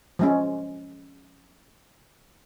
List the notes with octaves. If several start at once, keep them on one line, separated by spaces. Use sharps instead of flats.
F3 G#3 C#4